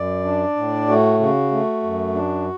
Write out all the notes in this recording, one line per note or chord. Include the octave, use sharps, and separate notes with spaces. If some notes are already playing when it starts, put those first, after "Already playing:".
Already playing: F#2 D5
D4
A2
A3 F#4
C#3 F#4
A3
F#2
D4